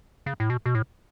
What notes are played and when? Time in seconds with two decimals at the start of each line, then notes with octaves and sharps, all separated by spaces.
0.26 C#3
0.40 A2
0.50 B2
0.66 B2
0.75 A2